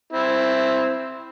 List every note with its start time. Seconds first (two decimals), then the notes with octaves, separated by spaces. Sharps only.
0.13 C4 E4